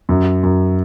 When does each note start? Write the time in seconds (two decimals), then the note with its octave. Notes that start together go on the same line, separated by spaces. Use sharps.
0.09 F#2
0.43 F#2